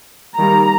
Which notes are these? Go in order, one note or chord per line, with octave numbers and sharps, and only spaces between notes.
D#3 G3 A#3 A#5